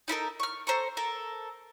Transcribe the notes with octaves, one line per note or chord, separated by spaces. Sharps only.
D#4 E4 A4 A#4
C#6 F6
A4 C5 A#5 C#6
A4 A#4